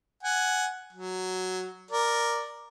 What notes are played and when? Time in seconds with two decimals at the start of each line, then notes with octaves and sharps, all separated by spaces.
0.23 F#5 G#5
0.93 F#3
1.91 A#4 D5